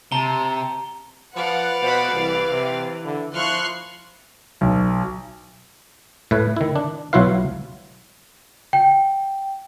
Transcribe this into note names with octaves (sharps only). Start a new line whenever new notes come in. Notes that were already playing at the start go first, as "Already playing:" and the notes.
C3 A5 A#5 G7
F3 B4 D5 F5 F#5
B2 C5 F#5 B5
C2 E3
C3
D3 E4
F3 E4 C6 C#6 F6 F#6
B1
A2 A3 B4
D#3 E4
D4
B1 F#3 E4 F4 B4 F5
G5